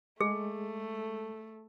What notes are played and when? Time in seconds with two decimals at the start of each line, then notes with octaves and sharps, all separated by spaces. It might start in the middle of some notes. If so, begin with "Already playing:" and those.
0.21 G#3 A3 G#4